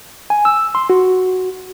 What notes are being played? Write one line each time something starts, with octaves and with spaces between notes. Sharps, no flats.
G#5
E6
C6
F#4